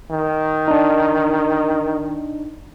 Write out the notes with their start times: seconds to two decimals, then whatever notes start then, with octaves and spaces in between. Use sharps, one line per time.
0.11 D#3
0.68 D4 D#4